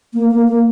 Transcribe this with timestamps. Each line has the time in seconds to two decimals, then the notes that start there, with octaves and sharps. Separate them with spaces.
0.14 A#3
0.30 A#3
0.48 A#3